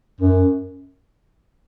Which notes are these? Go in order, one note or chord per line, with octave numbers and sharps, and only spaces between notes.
F#2